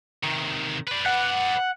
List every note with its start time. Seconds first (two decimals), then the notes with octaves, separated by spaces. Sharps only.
0.24 C3 D#3
0.87 B4 D5
1.06 F#5